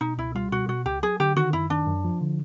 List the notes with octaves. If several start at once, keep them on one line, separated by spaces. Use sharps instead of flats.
B2 D#4
C#2 E4
G3 F4
B2 F#4
B2 F#4
C#2 G4
F#3 G#4
D3 G4
D#3 F#4
F#2 E4
D#3 D4
F#2
F3
D3